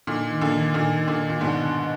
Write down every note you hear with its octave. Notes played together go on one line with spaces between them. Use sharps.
A#2 D3 D#4
D#3
A#2 D3
D#3
A#2 D3 D#4
D#3
A#2 D3
D#3
A#2
G#2 B2 D4
D3